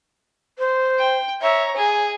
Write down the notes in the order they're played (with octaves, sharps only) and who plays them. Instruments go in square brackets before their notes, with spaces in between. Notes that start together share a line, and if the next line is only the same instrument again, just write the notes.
[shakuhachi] C5
[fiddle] G5
[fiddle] C#5 A#5 [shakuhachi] E5
[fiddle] G#4 [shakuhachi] G#5